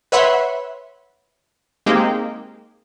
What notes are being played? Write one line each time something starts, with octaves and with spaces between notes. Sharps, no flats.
B4 C#5 E5 F#5 B5 C6
G#3 A#3 C4 D#4 G4